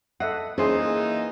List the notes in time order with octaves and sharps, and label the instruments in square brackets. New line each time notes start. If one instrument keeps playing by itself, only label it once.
[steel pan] A4 E5 F#5 [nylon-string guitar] D#5
[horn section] E3 A#3 D#4 [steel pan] C#4 C5 C6 [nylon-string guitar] G#4